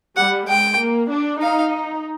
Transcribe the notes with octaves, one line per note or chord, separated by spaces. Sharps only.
G3 F#5
G#3 G5
A#3
D4
D#4 F5